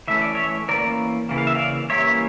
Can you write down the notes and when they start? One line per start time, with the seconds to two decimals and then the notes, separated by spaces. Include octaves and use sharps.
0.08 E3 A3 C#4 E5
0.21 D5
0.35 C#5 E5
0.68 E3 A#3 C#4 A#4 D5
1.29 C#3 E3 A#3
1.38 F5
1.47 E5
1.55 D5 F5
1.90 E3 G3 A#3 C#4 C#5 E5